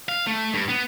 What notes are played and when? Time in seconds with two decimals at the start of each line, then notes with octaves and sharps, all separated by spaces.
0.09 F5
0.27 A3
0.54 G2
0.69 B3